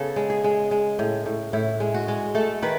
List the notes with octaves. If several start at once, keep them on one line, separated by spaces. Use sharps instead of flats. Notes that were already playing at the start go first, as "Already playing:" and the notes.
Already playing: C#3 B3 A4
G#3
G#4
G#3
G#3
A2
A2
A2 E4
G#3
F#4
G#3
A3 A4
D#3 B4